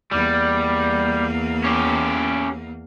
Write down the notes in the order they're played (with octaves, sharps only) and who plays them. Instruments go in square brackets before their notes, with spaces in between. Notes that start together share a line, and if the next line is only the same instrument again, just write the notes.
[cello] E2 A#3 [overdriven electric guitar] G3
[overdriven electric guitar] C#4 G4